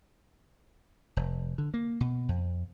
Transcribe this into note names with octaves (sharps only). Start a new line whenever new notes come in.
F1
D3
A#3
B2
F2